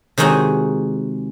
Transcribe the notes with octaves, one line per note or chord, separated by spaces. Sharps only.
C3 D#3 G#3 D#4 F#4 G#4